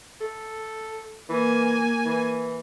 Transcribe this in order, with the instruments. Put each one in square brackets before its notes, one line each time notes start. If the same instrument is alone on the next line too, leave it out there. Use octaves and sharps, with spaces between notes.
[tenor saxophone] A4
[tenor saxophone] E3 [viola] A#3 G#5
[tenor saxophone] E3